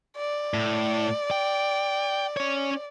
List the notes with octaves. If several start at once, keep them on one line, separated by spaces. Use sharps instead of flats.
D5
A2
G5
C#4 C#5